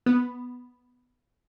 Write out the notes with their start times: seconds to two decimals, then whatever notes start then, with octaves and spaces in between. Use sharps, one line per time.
0.06 B3